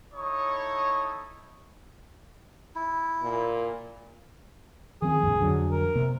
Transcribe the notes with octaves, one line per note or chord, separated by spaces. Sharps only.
D#4 E4 A4 C#5 C#6 D#6
E4
A#2
D#3 F3 C4 G#4
C2 G2 A#2
F2 D3 F#3
A#4
C3 A#3